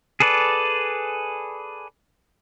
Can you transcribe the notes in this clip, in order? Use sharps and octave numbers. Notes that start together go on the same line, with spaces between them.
G#4 A4 B4 D5